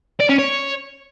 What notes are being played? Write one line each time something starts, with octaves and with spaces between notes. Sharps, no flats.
D5
C#4
C#5